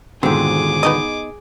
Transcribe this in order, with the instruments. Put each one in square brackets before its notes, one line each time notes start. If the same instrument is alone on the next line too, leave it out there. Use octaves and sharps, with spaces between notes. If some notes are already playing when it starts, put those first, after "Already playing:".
[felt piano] D#1 G#2 B2 [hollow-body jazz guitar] D3 D#3 [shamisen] C4 [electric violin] G#4 D6
[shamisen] B3 D#4 D#5